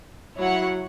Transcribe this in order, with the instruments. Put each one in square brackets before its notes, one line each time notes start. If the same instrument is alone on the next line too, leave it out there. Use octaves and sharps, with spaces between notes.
[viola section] F#3 [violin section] E4 C#5 F#5